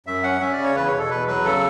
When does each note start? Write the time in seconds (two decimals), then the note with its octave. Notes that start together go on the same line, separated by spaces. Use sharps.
0.06 F#2 E5
0.23 C#4 F#5
0.40 C#4 E5
0.53 D5
0.58 C#3
0.64 C#5
0.75 E2 B4
0.87 C#5
0.93 B2 A4
1.10 E2 B4
1.28 F#3 B4
1.45 C#3 A4